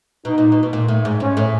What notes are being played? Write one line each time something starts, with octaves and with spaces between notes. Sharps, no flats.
B2 D#4
A#2
B2
B2
A#2
A2
G#2
G#2 C#4
A2